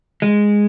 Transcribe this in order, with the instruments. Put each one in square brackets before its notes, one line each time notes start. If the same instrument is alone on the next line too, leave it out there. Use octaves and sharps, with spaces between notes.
[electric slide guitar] G#3